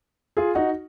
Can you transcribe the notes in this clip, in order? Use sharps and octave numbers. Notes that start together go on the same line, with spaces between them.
F4 G#4
D#4 F#4